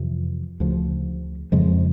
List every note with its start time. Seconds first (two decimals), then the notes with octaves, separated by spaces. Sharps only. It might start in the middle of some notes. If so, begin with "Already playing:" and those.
Already playing: F2 C3 E3
0.60 D2 C#3 F3
1.52 F2 C#3 F3 G#3